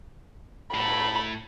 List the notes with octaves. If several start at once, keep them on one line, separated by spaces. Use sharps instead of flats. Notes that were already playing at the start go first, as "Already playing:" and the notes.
A2 B5